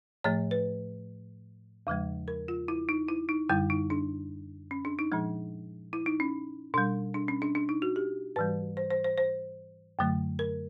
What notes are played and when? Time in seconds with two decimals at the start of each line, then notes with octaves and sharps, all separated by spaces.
0.24 A2 F3 A3 C#5
0.51 B4
1.87 E2 C#3 F3 G#3
2.28 A#4
2.48 F4
2.68 E4
2.89 D#4
3.09 E4
3.29 D#4
3.49 F#2 D3 G3 E4
3.70 D#4
3.90 D4
4.71 C#4
4.85 D4
4.99 D#4
5.12 A#2 F3 G#3
5.93 E4
6.06 D#4
6.20 C#4
6.74 B2 G3 D4
7.14 D4
7.28 C#4
7.42 D4
7.55 D4
7.69 D#4
7.82 F#4
7.96 G4
8.36 G#2 E3 G3 B4
8.77 C5
8.90 C5
9.04 C5
9.18 C5
9.99 F#2 D3 F#3 A3
10.39 A#4